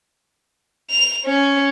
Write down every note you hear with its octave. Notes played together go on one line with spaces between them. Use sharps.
F7
C#4